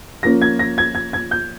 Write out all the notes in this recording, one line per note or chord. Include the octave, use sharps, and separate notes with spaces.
F3 A#3 C#4 A#6
G#6
A#6
G#6
G#6
G#6
G6